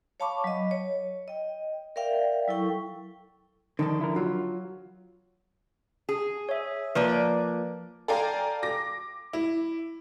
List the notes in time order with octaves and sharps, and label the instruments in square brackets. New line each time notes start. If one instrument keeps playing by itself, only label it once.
[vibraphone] C#5 F5 A5 B5 C#6 D6
F#3 D#5
C#5
D#5 G5
A#4 D5 E5 F5 G5
F#3 E4 A4 G5 C#6
[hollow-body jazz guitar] D3 F3 A5 [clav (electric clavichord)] D#3
[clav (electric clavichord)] E4 A#4
[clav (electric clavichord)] F#3 [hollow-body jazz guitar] F4
[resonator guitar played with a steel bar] G#4
[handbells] C#5 E5
[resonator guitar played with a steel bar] F3 A#3 D5 [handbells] B4
[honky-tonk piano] A4 D5 F5 G5 G#5 A#5
D6 A#6
E4